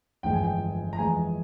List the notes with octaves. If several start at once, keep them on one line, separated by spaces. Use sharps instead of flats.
G1 F2 E3 G#3 G5
G#5
G5
A#5
F2 E3 G#3 G#5